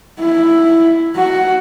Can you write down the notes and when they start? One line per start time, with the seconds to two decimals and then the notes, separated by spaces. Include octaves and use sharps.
0.20 E4
1.16 F#4